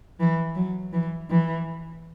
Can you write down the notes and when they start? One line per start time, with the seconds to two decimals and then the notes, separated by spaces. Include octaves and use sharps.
0.20 E3
0.56 F#3
0.93 E3
1.30 E3